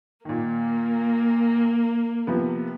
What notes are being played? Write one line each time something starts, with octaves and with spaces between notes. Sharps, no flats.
A#2 D#3 A#3
C3 F3 B3